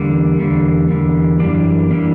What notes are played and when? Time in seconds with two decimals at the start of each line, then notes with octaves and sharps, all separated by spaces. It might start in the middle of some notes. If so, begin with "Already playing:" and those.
Already playing: E2 D3 G3 A#3
0.38 E2 D3 G3 A#3
0.89 E2 D3 G3 A#3
1.40 F#2 E3 G3 A#3 D4
1.91 E3 G3 A#3 D4